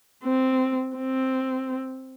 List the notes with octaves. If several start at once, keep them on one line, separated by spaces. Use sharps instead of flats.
C4
C4